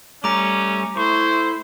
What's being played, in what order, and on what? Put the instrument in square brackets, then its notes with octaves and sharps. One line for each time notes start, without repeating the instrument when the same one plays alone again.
[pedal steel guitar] G3 A3 [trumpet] C#4 [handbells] A#5 D6
[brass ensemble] A3 E4 [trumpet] C5 [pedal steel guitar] C#6